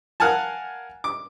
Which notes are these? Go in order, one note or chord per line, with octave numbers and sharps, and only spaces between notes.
A#4 F5 F#5 G#5 A5
D6